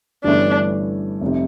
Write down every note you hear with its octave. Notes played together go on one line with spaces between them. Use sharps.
G1 G2 E3 A3 C#4 D4
F1 C3